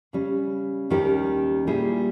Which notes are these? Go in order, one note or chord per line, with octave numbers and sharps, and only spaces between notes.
C#3 G3 C#4
D#2 D#3 G3 C#4 G4
A#2 G3 A#3 E4 G#4